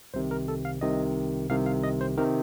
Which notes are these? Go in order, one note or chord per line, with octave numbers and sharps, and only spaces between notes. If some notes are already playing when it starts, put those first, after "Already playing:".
C2 C3 D#3 C5
A#4
A4
F5
C2 C3 D#3 D#5
C2 C3 D#3 F5
F5
D#5
C5
C3 D#3 A#4